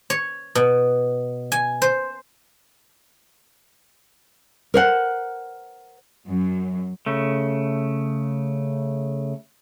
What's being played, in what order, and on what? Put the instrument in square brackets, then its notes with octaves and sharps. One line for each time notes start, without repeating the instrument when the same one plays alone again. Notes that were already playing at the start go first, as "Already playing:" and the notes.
[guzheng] C#5
B2
G#5
C5
[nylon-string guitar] A#4 C5 F#5
[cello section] F#2
[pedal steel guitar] C#3 A3